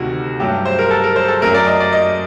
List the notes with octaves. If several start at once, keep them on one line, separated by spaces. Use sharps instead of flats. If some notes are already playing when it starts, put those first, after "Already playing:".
Already playing: D2 C3 D#3 F#4
G2 F#3 A3 G4
C5
A#4
A4
A#4
C5
A4
F#2 F#3 A3 A#4
D5
D#5
D5
D#5